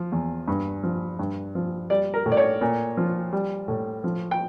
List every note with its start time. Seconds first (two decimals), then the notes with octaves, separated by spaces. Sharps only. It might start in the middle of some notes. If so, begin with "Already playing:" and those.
Already playing: F3
0.12 E2
0.47 G2
0.83 F3
1.19 G2
1.55 F3
1.90 G3 D5
2.14 A#4
2.26 A2
2.32 D5
2.37 C#5
2.61 A#2
2.97 F3
3.33 G3
3.68 A2
4.04 F3
4.31 G5